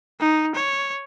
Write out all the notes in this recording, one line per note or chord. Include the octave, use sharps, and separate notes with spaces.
D#4
C#5